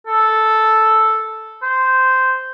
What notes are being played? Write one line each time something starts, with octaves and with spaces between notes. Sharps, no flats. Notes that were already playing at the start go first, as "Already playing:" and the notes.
A4
C5